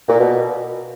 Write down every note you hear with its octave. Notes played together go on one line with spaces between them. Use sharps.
A#2
B2